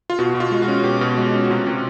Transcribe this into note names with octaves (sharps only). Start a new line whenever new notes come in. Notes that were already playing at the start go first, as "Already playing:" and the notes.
F4
B2 F#4
B2
F4
G#3
F#4
C#4
B2 G4
B2
G#3 F#4
C#4
F#4
C3 F4
C3